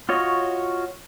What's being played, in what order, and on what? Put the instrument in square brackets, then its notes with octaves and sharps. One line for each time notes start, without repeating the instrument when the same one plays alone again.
[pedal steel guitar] F4 F#4 C#5 D#5